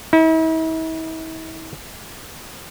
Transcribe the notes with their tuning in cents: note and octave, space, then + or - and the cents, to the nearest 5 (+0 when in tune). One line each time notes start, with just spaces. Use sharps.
E4 -45